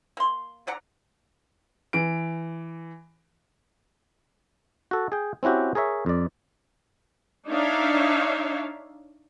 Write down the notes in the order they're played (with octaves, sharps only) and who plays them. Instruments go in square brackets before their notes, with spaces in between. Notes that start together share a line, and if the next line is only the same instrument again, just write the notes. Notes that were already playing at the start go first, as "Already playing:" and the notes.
[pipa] A#3 C6
D3 D5 F#5 A#5
[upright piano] E3 D7
[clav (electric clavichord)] F#4 A4
G#4 G5
C4 C#4 E4 F#4 G4
G#4 A#4 C#5 E5
F2 D5
[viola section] D4 D#4 C#5 E5 F5